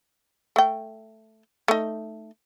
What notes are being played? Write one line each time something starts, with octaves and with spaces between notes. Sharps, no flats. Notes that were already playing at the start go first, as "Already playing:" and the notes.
A3 G5
A3 D#4